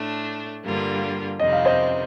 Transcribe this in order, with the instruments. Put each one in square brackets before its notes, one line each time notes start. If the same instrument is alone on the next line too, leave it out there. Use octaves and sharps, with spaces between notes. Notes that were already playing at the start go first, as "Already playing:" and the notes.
Already playing: [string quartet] A2 A3 D4
G2 D3 G3 A#3 F4
[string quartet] F2 C3 D#3 G3 C4 [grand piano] D#5
[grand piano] F5
C5 D#5